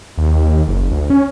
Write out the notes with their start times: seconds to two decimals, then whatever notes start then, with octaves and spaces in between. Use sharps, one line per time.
0.17 D#2
0.68 F#1
0.91 D2
1.10 C#4